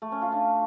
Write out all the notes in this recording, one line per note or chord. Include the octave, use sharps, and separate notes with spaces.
A3
C#4
F4
D4